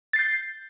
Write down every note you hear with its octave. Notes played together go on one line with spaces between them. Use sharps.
G6 A6 C7